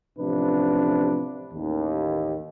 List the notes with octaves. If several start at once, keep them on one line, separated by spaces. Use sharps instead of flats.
A1 C3 F3 D4 B4
A1 D#2